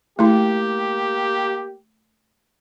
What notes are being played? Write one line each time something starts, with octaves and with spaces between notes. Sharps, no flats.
A3 A#3 E4 G4